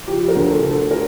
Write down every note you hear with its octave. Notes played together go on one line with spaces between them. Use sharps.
F3 G4
A#4
D2
A4
D3
A4
A#4